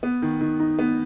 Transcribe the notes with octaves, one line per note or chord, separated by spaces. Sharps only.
B3
D#3
D#3
D#4
B3